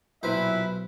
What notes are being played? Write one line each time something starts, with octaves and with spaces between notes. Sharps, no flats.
B1 A#2 E4 B4 C5 E5